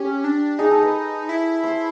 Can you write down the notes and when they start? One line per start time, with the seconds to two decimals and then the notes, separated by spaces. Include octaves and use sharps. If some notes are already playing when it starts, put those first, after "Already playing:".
Already playing: C#4 G4
0.24 D4
0.59 D#4 G#4
0.71 A4
0.83 B4
1.29 E4
1.64 C5